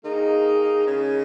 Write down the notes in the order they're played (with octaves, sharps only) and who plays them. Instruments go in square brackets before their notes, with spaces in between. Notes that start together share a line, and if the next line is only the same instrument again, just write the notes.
[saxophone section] D#3 A#3 D#4 [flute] G#4
[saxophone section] C#3 G#3 C#4